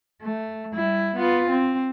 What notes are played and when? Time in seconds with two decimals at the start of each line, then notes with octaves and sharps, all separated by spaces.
0.22 A3
0.74 G3 E4
1.16 B3 F4
1.50 C4